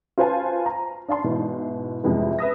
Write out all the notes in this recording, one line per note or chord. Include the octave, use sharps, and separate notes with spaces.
F4 B4 C5 F5 G#5 A5
A#5
D4 F5 A5 C6
G#2 B2 E3
F2 A2 C3 E3 G#3 B3
B4 E5 D#6 A#6